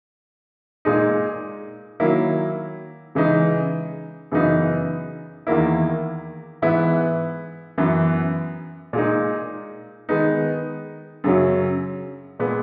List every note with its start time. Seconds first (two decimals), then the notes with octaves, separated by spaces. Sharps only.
0.85 A#2 G#3 D#4
2.00 D#3 F#3 A#3 E4
3.15 C#3 E3 G#3 D#4
4.32 F#2 C#3 E3 B3 D#4
5.47 E2 D#3 A#3 E4
6.62 G#2 E3 B3 E4
7.78 F#2 E3 B3
8.93 A#2 G#3 D#4
10.09 D#3 G#3 B3 D#4
11.24 F#2 C#3 F#3 C#4
12.40 A#2 G#3 B3